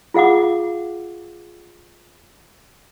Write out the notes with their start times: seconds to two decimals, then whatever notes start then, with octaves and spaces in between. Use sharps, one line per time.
0.14 F4 G#4 F5 F#5 D6